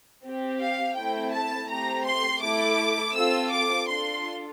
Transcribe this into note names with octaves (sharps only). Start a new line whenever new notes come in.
C4 G4
F5
A3 C4 E4 G5
A5
A3 C4 G4 A#5
C6
A3 E4 A4 D6
C4 F4 A4 E6
D6
D4 F4 A4 C6